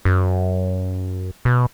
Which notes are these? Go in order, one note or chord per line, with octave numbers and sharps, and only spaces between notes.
F#2
B2